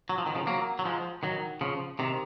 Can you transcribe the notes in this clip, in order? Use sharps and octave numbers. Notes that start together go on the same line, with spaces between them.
F#3
F3
D#3
C#3 F3
F#3 A#3
F#3
F3 G#3
D#3 F#3
C#3 F3
C3 D#3